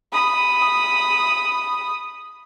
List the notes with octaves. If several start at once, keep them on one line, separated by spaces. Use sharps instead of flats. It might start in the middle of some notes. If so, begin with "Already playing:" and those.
B5 D#6